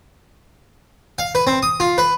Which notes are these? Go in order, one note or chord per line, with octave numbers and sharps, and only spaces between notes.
F5
B4
C4
D#6
F4
B4